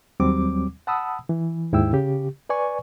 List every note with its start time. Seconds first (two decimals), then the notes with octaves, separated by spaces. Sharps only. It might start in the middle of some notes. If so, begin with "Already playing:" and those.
0.20 D#2 F#3 G3 C4 D6
0.87 F#5 A5 B5 D#6 E6
1.29 E3
1.72 D#2 G#2 E4 G5 E6
1.93 C#3 G4
2.49 B4 D5 G#5 C#6